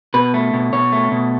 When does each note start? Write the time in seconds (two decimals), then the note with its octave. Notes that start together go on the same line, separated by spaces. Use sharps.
0.14 B2 B4
0.34 A3
0.53 B2
0.73 B2 C#5
0.92 A3
1.11 B2